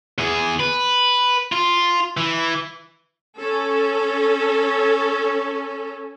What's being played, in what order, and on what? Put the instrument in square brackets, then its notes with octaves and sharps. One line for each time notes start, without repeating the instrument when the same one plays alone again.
[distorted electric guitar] E2 G#4
B4
F4
E3
[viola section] C#4 A4